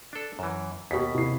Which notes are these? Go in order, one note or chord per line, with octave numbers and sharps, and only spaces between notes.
D4 A4
F#2 E3
D#2 B2 G4 B6
C3 E4 C7